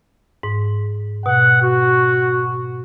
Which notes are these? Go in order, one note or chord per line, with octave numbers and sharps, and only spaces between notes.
G#2
B2 F#5
F#4